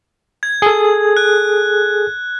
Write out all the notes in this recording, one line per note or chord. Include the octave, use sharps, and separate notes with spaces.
G#6
G#4 A4
F#6